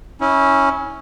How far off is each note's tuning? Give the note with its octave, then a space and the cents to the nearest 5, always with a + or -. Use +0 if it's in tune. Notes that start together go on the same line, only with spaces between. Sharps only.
C#4 +0 E4 -30